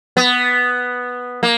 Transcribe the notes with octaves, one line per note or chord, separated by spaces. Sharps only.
B3
A#3